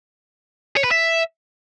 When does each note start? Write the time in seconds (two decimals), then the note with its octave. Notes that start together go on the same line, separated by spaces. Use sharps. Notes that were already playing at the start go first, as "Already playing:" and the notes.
0.77 C#5
0.84 B4
0.91 E5